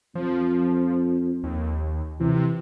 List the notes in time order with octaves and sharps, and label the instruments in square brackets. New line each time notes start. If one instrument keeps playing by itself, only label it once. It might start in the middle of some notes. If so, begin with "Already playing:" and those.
[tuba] F2 [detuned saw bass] F3
[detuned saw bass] D#2
[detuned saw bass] C3 [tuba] E3